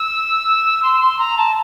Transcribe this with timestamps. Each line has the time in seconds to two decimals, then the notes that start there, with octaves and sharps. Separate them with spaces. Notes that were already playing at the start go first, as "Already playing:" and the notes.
Already playing: E6
0.83 C6
1.00 C6
1.19 A#5
1.38 A5